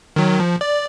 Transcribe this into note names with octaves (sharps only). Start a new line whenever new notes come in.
D#3 F#3
F3
D5